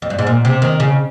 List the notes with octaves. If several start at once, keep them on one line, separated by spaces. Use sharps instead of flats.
F2
G2
G#2
A#2
C3
D#3
C#3